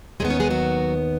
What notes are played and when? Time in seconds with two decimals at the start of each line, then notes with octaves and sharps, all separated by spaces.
0.20 D#2 D#3 G#3 B3 G#4
0.30 C#4 C#5
0.40 G#3 G#4
0.50 F#3 F#4